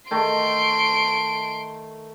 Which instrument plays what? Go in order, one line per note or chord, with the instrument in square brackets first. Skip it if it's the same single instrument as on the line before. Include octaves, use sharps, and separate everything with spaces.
[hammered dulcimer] D#3 A3 [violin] C6 D7